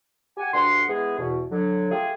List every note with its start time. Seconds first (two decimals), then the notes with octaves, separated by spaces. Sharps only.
0.37 G4 F#5 G#5
0.53 D2 G2 D4 F#5 C6
0.88 G#3 B3 E4 G#4
1.18 E2 B2
1.52 D3 F#3
1.91 A3 F4 G4 G#4